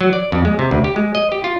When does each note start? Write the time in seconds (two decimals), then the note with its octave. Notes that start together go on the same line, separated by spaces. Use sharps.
0.01 F#3
0.13 D5
0.32 F2
0.45 G#3
0.59 C3
0.71 D2
0.84 G4
0.96 G#3
1.15 D#5
1.32 G4
1.44 F4